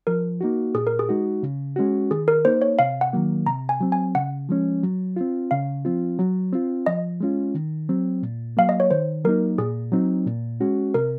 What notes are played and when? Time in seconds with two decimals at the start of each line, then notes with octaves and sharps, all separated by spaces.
0.07 F3 A#4
0.41 A#3 D#4 F#4
0.75 A#2 G#4
0.87 A#4
0.99 G#4
1.09 G#3 D#4 F#4
1.43 C#3
1.76 G#3 C#4 F#4
2.11 D#3 G#4
2.28 A#4
2.45 A#3 D#4 C5
2.62 C#5
2.79 C3 F5
3.01 F#5
3.13 D#3 F#3 A#3
3.46 C3 A#5
3.69 G#5
3.81 F#3 C4
3.92 G#5
4.15 C#3 F#5
4.49 F3 G#3 C#4
4.83 F#3
5.16 C4 F4
5.51 C#3 F5
5.85 F3 C4 F4
6.19 F#3
6.53 C4 F4
6.86 F3 D#5
7.20 G#3 C#4 F4
7.55 D#3
7.89 F#3 C4
8.23 A#2
8.57 F#3 A#3 F5
8.69 D#5
8.80 C#5
8.91 D#3 C5
9.25 F#3 A#3 D#4 A#4
9.58 A#2 G#4
9.92 F#3 C4 D#4
10.26 A#2
10.60 G#3 C#4 F#4
10.94 C3 A#4